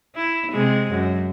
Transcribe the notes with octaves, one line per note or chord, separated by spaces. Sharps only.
E4
C3 G#3
F#2